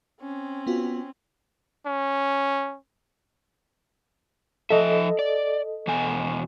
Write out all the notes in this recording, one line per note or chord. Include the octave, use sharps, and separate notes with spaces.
C4 C#4
B3 F4 F#4
C#4
F3 A4 D#5 E5
D5
E2 B2 G#5